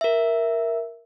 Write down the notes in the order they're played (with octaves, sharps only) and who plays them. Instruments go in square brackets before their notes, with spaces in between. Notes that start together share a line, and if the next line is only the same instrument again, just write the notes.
[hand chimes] A#4 E5